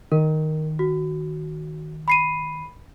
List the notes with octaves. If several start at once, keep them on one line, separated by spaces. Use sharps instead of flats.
D#3 A#4
F#4
B5 C7 D#7